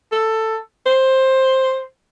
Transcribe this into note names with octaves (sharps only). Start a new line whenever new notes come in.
A4
C5